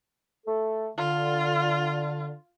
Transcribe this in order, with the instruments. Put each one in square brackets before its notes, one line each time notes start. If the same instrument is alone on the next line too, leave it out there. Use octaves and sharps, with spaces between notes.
[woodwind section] A3 A4
[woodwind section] D3 [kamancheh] F4